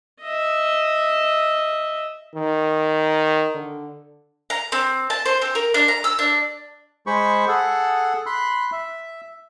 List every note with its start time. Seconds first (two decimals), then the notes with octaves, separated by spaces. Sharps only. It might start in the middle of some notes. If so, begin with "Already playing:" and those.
0.21 D#5 E5
2.35 D#3
3.55 D3
4.50 A#5
4.72 C4
5.10 A5
5.26 C5
5.42 C4
5.55 A#4
5.74 D4
5.88 A#5
6.04 E6
6.19 D4
7.07 G#3 G#4 C5 B5 C#6
7.48 G#4 A4 F#5
8.26 B5 C6 F#6
8.72 E5